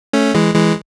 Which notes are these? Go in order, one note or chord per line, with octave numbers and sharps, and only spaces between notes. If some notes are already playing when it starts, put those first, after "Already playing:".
A3 C#4
E3 G#3
E3 G#3